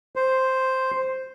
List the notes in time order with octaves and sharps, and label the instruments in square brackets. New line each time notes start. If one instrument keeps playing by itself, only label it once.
[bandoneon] C5